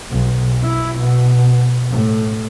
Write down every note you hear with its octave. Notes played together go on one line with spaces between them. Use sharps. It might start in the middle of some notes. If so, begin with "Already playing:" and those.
B1
E4
B2
A2